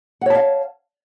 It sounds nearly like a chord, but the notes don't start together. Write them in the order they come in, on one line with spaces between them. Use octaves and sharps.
F#5 C#5 A5 F5